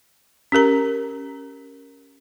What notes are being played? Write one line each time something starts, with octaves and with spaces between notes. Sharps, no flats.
C#4 G4 A#4 A#5